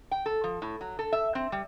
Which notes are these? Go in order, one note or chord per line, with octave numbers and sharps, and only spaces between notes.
G5
A4
F3
A2
F#3
A4
E5
C4
G3